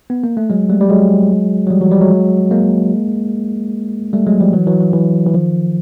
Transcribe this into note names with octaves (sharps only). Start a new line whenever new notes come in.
B3
A#3
A3
F#3 G#3
G3 A3
G3
F#3 G#3
F#3
F3 G3
E3 F#3
F3 G3
F#3 G#3
G#3 A#3
G3 A3
F#3 G#3
F3 G3
E3 F#3
E3 F#3
E3
E3
E3
D#3 F3